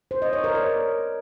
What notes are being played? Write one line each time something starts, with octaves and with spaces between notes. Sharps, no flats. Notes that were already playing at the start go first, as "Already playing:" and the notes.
C5
D#5
C#5
A#4
D5